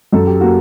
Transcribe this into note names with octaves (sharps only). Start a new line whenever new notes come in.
F#2 A4
G4
A#3 F#4